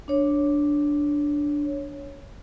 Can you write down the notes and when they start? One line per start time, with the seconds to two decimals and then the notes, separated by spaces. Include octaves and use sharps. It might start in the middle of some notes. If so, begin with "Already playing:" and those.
0.08 D4 C#5